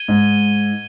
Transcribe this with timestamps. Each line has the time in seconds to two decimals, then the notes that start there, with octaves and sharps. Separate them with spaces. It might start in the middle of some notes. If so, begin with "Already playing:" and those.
Already playing: G#6 D#7 G7
0.08 G#2